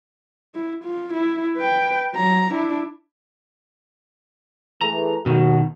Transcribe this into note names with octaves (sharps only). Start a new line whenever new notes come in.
E4
F4
E4
B4 G5
F#3 A#5
D4 E4
E3 A3 G#4 A#5
D#2 B2 D#3 A3 F#4